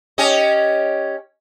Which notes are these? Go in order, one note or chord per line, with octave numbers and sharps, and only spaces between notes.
C#4 G4 D#5